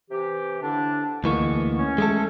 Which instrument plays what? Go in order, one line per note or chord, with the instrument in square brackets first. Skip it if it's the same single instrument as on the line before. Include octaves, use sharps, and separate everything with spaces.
[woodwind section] C3 E3 G4
A2 D3 D4
[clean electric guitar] D2 E3 A#3 [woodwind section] G#3 B3 C#6
[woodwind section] C#4
[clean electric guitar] G#3 A3 A4